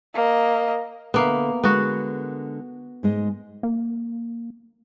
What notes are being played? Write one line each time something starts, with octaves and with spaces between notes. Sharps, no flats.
A#3 D#5
D3 A#3 B3 E5 F5
D3 G#3 B3 F#4 A#4
G#2 G#3 D#5
A#3